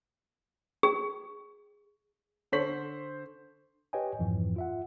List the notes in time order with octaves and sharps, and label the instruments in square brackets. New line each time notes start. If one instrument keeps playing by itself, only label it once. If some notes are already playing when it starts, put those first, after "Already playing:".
[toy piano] G#4
[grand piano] D3 A4 C5 C#6 B6 F#7
[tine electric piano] G4 B4 C#5 D#5 G5 G#5
F2 G#2 E3 F3
F4 E5 F#5